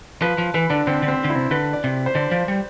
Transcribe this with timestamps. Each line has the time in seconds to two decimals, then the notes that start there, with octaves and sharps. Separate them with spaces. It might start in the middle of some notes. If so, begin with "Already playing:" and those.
0.22 F3 B4
0.38 F3
0.54 E3 B4
0.70 D3 D4
0.87 D3 C4
1.02 D3
1.08 C4
1.24 D3
1.30 E4
1.35 C3
1.51 D3 B4
1.73 D5
1.84 C3
2.06 C5
2.15 D3 D5
2.31 F3
2.48 G3